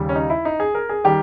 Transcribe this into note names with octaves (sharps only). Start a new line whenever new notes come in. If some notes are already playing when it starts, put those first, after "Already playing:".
Already playing: D#2 C#3 G3
C#4
D#4
E4
D#4
G#4
A#4
G#4
D#3 G3 G4